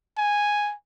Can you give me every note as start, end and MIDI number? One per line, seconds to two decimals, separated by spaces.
0.18 0.74 80